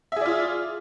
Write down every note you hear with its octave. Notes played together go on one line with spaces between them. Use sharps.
F4 G#4 D5 E5